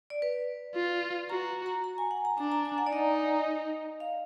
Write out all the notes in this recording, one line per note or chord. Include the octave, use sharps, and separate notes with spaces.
D5
B4
F4
F#4 A#5
A#5
A#5
G#5
F#5
A#5
D4 A#5
A#5
G#5
F#5
D5
D#4 D#5
F5